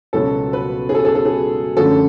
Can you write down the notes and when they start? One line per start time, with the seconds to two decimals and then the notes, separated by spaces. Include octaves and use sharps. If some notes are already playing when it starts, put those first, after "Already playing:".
0.13 C#2 B2 F#3 B3 A4
0.53 B4
0.89 G#4
0.95 A4
1.05 A4
1.15 A4
1.25 G#4
1.76 F#2 D3 F3 A3 C#4 A4